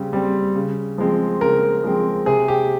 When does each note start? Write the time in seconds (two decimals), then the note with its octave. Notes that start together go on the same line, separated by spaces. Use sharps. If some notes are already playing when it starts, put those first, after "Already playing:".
Already playing: C#3 G3 C4
0.13 G3 C4
0.55 C#3
0.98 F3 G#3 C4
1.41 C#3 A#4
1.83 F3 G#3 C4
2.26 C3 G#4
2.48 G4